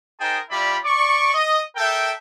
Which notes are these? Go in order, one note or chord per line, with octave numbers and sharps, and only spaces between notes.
D#4 G#4 A#4 C5 G5 A5
G3 E4 F4 D5 B5
D5 C#6 D6
D#5
A4 A#4 E5 G5